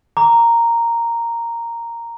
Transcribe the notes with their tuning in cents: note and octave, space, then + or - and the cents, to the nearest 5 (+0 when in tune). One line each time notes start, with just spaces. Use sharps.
A#5 -5 D6 -30